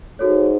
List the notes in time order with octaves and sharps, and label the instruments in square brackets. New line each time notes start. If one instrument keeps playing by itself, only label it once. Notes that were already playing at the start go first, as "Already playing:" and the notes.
[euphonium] G#2 [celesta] F#4 A4 C#5